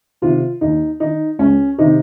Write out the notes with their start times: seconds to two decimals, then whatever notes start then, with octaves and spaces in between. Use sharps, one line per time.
0.22 C3 D#3 F4
0.61 D#2 D#4
1.00 D#3 D#4
1.39 C#2 C#4
1.78 C3 D#3 D#4